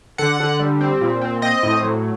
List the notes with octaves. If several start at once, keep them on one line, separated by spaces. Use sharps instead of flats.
D3 F#5
D3
G3
C4
A#2
C4
C4 D#5
A2
F#3